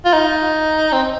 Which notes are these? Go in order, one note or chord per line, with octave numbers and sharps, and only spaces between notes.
F4
D#4
C4